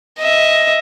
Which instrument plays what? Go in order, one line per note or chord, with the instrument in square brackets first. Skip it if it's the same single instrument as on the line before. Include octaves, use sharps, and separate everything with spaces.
[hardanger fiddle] D#5 E5